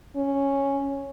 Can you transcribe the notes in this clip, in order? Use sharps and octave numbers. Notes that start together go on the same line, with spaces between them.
C#4